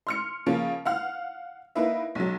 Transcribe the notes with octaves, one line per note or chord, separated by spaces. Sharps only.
C6 F6 C#7
C#3 F3 A#3 C#4
F5 F#5 F6
A#3 D#4 E4 B4 E5
B1 F#3